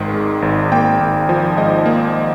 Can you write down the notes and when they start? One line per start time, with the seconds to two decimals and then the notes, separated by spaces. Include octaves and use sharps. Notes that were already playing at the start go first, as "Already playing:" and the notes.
Already playing: G#1 G#2 D#3 G#3
0.14 G#3
0.42 G#1
0.72 A#3 G5
1.01 G#1
1.29 F3
1.57 G#2 D#5
1.86 A#3